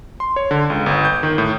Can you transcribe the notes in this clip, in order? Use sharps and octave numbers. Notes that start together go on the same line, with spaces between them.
C6
C#5
D3
C#2
G1
G6
D#3
A2